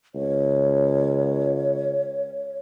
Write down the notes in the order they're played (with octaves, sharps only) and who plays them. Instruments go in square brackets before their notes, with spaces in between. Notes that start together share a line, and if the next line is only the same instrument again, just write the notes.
[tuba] C#2 [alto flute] C#5